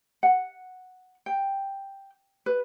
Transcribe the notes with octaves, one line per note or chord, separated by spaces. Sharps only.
F#5
G5
B4